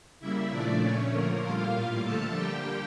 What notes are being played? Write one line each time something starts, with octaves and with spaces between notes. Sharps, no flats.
C#3 G3 A#3 E4 E5
A#2 F3 A3 D4 D5
A#2 A3 C#4 C#5
D3 F3 A3 A#3 A#4
A#2 G3 A#3 F4 F5
A2 G3 A#3
D3 F3 A3 A4 A5
D3 G3 A#3 G4 G5